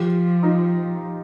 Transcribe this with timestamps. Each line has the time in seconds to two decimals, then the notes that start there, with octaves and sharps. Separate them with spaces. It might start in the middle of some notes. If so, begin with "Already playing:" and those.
Already playing: F3 F4 G4
0.43 D#4 F4